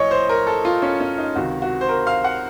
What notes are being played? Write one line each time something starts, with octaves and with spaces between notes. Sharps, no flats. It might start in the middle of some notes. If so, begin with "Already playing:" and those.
Already playing: A#1 A2 C#5 D#5
C5
A#4
A4
F4
C#4
C#4
D#4
C#2 C3 D#3 F#4
F#4
C5
A#4
F5
F#5